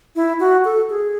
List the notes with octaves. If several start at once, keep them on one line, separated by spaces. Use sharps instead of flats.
E4
F#4
A4
G#4